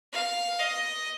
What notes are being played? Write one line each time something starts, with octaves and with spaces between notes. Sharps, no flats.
F5
D#5